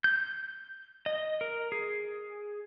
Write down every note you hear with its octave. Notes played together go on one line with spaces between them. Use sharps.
G6
D#5
A#4
G#4